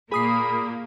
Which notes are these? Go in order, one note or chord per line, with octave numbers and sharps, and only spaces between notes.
A#2 A#3 G#4 B5 D#6 C7